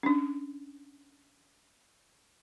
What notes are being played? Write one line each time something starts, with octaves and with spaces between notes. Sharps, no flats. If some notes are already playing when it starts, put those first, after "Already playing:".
C#4 D4